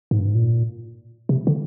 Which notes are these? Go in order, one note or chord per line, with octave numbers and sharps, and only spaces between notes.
G#2
G2
G#2
A#2
C3
D3